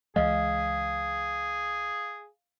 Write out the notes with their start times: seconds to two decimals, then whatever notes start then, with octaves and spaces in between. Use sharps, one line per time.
0.16 C#2 E3 G#3 G#4 D#5 F5